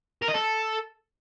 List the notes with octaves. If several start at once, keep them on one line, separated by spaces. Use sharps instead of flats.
A#4
D#5
A4